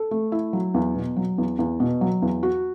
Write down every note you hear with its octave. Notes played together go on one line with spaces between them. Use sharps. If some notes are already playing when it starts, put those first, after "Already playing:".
Already playing: A4
A3
E4
F#3
E2
B2
F#3
E2
E2
B2
F#3
E2
F#4